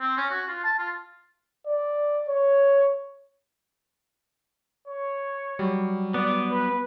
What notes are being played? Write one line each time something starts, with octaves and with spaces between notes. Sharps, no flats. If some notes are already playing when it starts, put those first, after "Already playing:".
C4
C#4
F#4
F4
A5
F4
D5
C#5
C#5
F#3 G3
B3 D5
B4